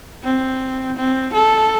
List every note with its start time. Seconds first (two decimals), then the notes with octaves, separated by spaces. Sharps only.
0.24 C4
0.97 C4
1.33 A4